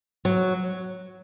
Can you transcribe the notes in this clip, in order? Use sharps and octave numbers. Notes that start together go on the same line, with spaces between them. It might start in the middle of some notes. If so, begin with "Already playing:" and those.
F#3